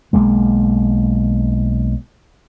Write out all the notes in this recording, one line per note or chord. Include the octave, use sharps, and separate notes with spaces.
B1 G#3 A#3